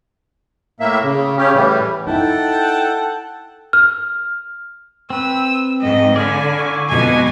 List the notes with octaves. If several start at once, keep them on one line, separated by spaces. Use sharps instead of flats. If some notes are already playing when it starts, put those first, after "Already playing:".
A2 A#3 E5
C#3
C#3 C#4 G4
A2 E3 G3
D#4 E4 A4 F#5 G5 A5
F6
C4 B4 E6
G#2 D#5
D3 D5 F5 G#5 B5
E4 C#6 D6
F2 G#2 B2 G#5